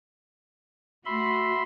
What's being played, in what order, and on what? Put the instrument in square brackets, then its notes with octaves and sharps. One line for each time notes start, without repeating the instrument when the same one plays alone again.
[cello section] A3 F#4 [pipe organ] E5 B5 C6